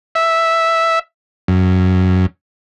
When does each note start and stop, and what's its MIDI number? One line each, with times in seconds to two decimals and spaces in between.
0.15 0.99 76
1.48 2.26 42